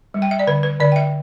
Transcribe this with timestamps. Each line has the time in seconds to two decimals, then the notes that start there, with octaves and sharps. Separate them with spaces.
0.14 G3
0.22 G5
0.31 E5
0.39 D5
0.47 D3 B4
0.63 B4
0.80 D3 D5
0.92 G5
0.96 E5